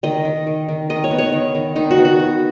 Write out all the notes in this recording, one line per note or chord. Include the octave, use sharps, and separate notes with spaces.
D#3 D#5
D#3
D#3
D#3
D#3 D#5
C#5
B3
C#5
D#3
D#3
D#3 D#4
F#4
B3
F#4
B3